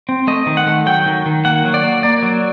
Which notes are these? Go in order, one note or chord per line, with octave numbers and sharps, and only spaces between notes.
C4
A3 D#5
D#3
F#5
A3
F#3 G5
D#3
D#3
A#3 F#5
F#3
D5
A#3
A#3 D5
F#3